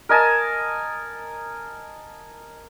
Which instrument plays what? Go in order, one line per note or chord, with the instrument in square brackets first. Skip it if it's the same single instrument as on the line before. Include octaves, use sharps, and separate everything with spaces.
[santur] A#4 D#5 G#5 A5